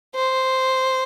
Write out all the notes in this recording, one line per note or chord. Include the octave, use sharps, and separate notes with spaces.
C5